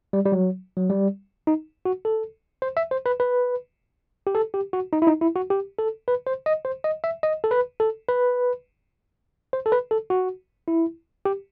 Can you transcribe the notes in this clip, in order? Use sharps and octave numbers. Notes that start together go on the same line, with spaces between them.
G3
G3
F#3
F#3
G3
D#4
F#4
A4
C5
E5
C5
B4
B4
G4
A4
G4
F#4
D#4
E4
D#4
E4
F#4
G4
A4
B4
C5
D#5
C5
D#5
E5
D#5
A4
B4
A4
B4
C5
A4
B4
A4
F#4
E4
G4